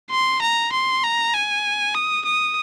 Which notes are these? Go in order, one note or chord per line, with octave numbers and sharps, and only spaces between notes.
C6
A#5
C6
A#5
G#5
D#6
D#6